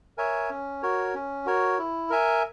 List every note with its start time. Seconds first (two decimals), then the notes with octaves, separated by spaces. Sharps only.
0.18 A#4 C#5 E5 G#5
0.50 C#4
0.83 F#4 A#4 C#5
1.14 C#4
1.46 F#4 A#4 C#5
1.78 E4
2.10 A#4 E5 G#5